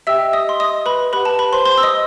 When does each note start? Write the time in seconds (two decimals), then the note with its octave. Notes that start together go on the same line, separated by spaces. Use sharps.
0.07 G4 D#5 E5 G5 E6
0.33 D#5 D#6
0.49 C6
0.60 D#5 D#6
0.86 B4 B5
1.13 G4 B4 F#5 B5
1.25 A5
1.39 B4 B5
1.53 C5 C6
1.65 C5 C6
1.78 E6
1.83 D#5 D#6